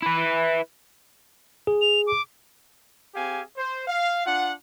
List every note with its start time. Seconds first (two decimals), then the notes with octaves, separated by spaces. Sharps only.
0.02 E4 B4
1.67 G#4
1.81 F7
2.07 D6
3.14 C4 G4 G#4 F5 G#5
3.57 C5
3.88 F5
4.26 D4 F4 F#5